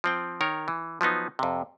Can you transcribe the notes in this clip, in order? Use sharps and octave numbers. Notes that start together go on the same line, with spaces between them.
F3 C4 G5
D#3 A#4 C#5
E3
F3 F#3 B3 D#4
F2 C3